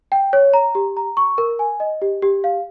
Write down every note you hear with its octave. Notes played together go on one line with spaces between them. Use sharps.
G5
C#5
A#5
G4
A#5
C#6
A#4
G#5
D#5
G4
G4
F5